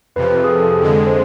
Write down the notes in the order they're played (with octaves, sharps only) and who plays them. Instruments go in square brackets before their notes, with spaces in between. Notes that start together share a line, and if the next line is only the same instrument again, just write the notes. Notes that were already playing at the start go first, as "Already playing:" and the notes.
[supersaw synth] F2 C3 F3 [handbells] B4
[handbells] G#4
A4
A4
G#4
[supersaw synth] F2 D3 G#3 [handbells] A4
[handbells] C5